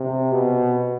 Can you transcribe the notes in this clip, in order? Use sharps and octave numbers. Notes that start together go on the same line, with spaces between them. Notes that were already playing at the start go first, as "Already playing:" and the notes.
Already playing: C3
B2